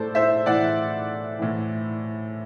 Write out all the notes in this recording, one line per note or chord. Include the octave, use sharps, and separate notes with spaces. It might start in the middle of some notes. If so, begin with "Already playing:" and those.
Already playing: A2 A4 C5 D5
C5 E5
A2 E3 D5 F#5
A2 E3